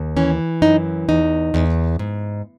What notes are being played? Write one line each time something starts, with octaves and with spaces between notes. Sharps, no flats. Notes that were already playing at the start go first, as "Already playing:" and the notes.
Already playing: D#2
E3 C#4
F#2 D#4
E2 D#4
E2
G#2